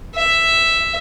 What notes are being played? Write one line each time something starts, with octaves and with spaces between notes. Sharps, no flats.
E5